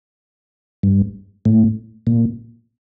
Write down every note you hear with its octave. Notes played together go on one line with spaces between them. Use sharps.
G2
A2
A#2